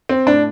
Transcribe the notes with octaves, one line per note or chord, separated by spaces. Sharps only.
C4
A2 D4